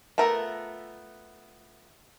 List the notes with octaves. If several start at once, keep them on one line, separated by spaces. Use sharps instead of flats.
A3 B3 F4 A#4 E5